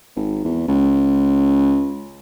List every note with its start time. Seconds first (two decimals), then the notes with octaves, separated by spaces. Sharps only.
0.16 G#1
0.45 E2
0.68 C#2